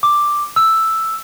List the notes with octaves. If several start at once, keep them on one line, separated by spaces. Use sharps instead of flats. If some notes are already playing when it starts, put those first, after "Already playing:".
D6
E6